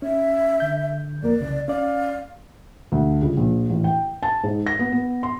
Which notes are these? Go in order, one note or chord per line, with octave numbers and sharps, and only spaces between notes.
C#4 E5
D3 G6
F2 A#3 A#4 D5
C2 C#3
C#4 D5 F5
D2
C#2
A#1
A1
G5
A5
G#2
A#6
B3
B3
C6